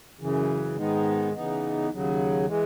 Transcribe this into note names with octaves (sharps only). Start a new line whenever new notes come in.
F#2 C#3 E3
G#2 D#3 G#3 B3 D#4
C#3 E3 B3 D#4
D#2 C#3 F#3
E3 G#3